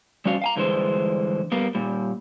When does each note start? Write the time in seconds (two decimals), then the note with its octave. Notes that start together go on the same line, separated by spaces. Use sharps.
0.25 G3 C#4 F#4 F5
0.42 F5 G#5 A#5
0.56 G2 D3 E3 G#3 C5
1.52 G3 A#3 B3
1.75 A#2 G3